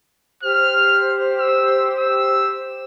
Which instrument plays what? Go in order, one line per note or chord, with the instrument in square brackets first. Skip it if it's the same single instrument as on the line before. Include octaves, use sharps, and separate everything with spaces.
[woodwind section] G4 C5 [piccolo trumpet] F6
[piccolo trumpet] E6
E6